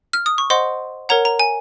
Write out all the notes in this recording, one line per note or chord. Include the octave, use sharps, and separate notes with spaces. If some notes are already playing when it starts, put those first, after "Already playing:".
F6
D#6
C#6
C5 D#5 F#5 C6
A#4 C#5 F#5 A#5
A#5
G#5